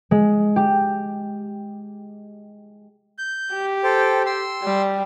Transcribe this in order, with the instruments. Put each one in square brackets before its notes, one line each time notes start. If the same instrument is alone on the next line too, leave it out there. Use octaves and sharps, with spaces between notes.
[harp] G#3
G4
[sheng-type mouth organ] G6
[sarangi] G4
[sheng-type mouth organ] A4 C5 G5
C6 E6
[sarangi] G3